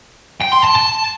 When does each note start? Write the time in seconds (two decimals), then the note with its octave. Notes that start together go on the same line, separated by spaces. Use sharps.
0.42 G5
0.53 C6
0.65 A5
0.76 A5